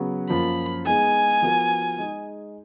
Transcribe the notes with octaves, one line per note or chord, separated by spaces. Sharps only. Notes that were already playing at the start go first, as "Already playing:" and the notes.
Already playing: C#3 F#3 B3
F#2 F3 A#3 F4 B5
G#3 B3 D#4 G#4 G#5
F3 B3 F#4 A#4
G#3 D#4 G#4